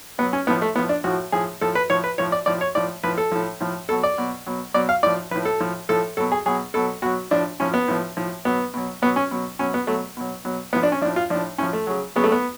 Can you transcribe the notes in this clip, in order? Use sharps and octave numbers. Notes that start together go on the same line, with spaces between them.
B2 F#3 B3
C#4
A2 F3 B3
A3
A2 F3 B3
D4
A2 F3 F#4
A2 F3 G#4
A2 F3 A4
B4
A2 F3 C#5
B4
A2 F3 C#5
D5
A2 F3 D5
C#5
A2 F3 D5
A2 F3 B4
A4
A2 F3
A2 F3
B2 F#3 A4
D5
B2 F#3
B2 F#3
B2 F#3 D5
F5
A2 F3 D5
A2 F3 B4
A4
A2 F3
A2 F3 A4
B2 F#3 A4
G#4
B2 F#3 G#4
B2 F#3 A4
B2 F#3 F#4
A2 F3 D4
A2 F3 C#4
B3
A2 F3
A2 F3
B2 F#3 B3
B2 F#3
B2 F#3 B3
C#4
B2 F#3
B2 F#3 C#4
B3
B2 F#3 A3
B2 F#3
B2 F#3
A2 F3 B3
D4
C#4
A2 F3 D4
F4
A2 F3 D4
A2 F3 C#4
A3
C#3 F#3
C#3 F#3 B3
A3
B3